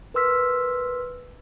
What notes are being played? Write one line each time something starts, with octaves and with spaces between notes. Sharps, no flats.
A#4 B4 C6 E6 F6 B6